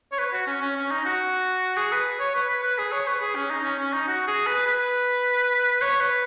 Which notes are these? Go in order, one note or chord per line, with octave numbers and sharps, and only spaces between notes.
C#5
B4
F#4
C#4
C#4
C#4
D#4
F#4
G#4
B4
C#5
B4
B4
B4
G#4
C#5
B4
G#4
C#4
D#4
C#4
C#4
D#4
F#4
G#4
B4
B4
C#5
B4